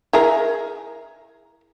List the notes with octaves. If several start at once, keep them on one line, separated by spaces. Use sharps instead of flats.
E4 G#4 A#4